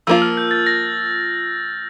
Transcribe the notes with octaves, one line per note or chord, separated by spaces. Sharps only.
F3 A#3 F4 E6
F6
G6
A6
A#6